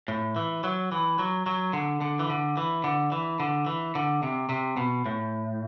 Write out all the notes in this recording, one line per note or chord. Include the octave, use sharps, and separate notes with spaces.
A2
E3
F#3
E3
F#3
F#3
D3
D3
E3
D3
E3
D3
E3
D3
E3
D3
C3
C3
B2
A2